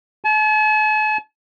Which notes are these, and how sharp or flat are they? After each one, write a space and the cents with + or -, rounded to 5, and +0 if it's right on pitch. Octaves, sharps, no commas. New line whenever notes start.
A5 -45